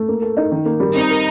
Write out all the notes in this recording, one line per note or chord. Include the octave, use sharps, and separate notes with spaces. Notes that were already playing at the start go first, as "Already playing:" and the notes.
Already playing: A3
A#3
A4
D#4
D#3
A#3
G3
C4 D#4
A#4